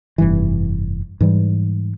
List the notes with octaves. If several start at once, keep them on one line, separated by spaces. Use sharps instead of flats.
F1 G2 E3
G#2 E3 G3